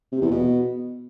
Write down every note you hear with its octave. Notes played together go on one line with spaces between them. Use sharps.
C3
E2
B2